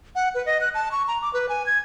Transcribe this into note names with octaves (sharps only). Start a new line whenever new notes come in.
F#5
B4
D#5
F#6
A5
C#6
A#5
D6
B4
G#5
G#6